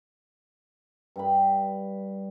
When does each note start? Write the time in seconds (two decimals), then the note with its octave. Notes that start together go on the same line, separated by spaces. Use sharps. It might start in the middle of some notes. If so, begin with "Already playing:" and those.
1.16 G2 G5 B5